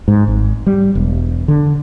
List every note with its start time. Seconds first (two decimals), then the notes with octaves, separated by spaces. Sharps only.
0.08 G#2
0.28 G#1
0.67 G3
0.95 E1
1.48 D3